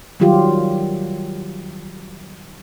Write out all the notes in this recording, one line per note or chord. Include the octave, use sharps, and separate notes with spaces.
D#3 F#3 G3 F4 G4